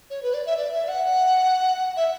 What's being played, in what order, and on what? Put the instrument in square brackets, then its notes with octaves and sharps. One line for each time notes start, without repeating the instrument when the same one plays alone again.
[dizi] C#5
B4
D5
E5
D5
E5
F#5
E5